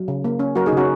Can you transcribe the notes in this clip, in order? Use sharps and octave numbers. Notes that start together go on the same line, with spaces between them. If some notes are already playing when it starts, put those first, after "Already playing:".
Already playing: F#3
C#3
A#3
C#4
F#3 F#4 A#4
D#4 G#4
C#3
C#4 F#4